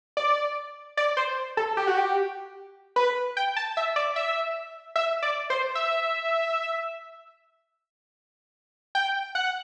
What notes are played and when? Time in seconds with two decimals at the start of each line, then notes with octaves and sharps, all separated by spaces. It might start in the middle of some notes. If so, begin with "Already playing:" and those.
0.17 D5
0.97 D5
1.17 C5
1.57 A4
1.77 G4
1.87 F#4
1.97 G4
2.96 B4
3.37 G5
3.56 A5
3.77 E5
3.96 D5
4.16 E5
4.96 E5
5.22 D5
5.50 C5
5.75 E5
8.95 G5
9.35 F#5